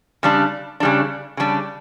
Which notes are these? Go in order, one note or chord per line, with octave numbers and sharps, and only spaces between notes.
C#3 G3 D4
C#3 G3 D4
C#3 G3 D4